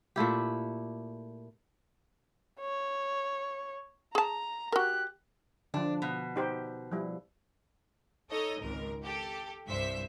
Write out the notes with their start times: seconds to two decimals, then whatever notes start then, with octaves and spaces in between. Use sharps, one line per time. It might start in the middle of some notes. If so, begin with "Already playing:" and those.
0.16 A#2 A3 E4 G4
2.60 C#5
4.15 G#4 A5 A#5
4.72 F#4 G4 A#4 F#6
5.74 D3 F3 D4
6.02 B2
6.36 D#4 G4 C5
6.92 F3 G3 E4
8.30 D#4 A4 C#5 D#5
8.60 G#1 C#2 A#4
9.04 G4 A4
9.66 C2 G2 C5 E5 B6